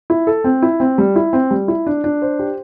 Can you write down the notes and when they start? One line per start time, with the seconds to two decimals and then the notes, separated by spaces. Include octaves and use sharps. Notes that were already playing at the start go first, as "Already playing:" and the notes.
0.10 E4
0.27 A4
0.44 C4
0.62 E4
0.80 C4
0.98 G3
1.16 E4
1.33 C4
1.51 G3
1.68 E4
1.87 D4
2.04 D4
2.22 C5
2.39 G4